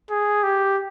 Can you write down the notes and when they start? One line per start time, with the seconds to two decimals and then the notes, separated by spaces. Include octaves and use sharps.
0.11 G#4
0.43 G4